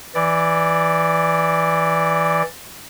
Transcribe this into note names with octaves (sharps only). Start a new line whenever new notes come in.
E3 D5